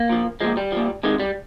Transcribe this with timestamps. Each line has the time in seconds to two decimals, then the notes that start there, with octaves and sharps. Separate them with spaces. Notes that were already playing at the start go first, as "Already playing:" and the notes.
Already playing: A#3
0.10 A#2 F3
0.41 A#2 F3 G#3
0.57 G3
0.72 A#2 F3
1.03 C3 D#3 G#3
1.20 G3